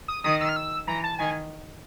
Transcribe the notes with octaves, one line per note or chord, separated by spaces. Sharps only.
D#6
D#3 D#6
E6
F6
E6
E3 A#5
A5
D#3 G#5